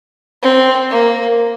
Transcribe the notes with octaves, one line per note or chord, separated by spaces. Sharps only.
C4
A#3